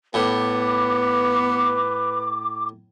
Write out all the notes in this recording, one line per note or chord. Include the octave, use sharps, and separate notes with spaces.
A2 B3 B4 D6